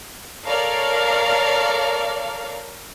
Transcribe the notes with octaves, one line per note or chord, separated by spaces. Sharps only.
A4 A#4 C#5 D5 F5